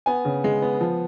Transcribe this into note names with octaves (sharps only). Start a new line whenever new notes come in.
B3 G#5
C#3
G#3
B3
F3